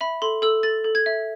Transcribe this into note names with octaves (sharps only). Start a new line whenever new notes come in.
E5 B5
A4 C6
A4 E6
A4 A6
A4
G#6
E5